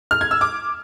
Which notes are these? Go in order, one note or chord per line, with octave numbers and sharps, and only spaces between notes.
F6
G#6
E6
D6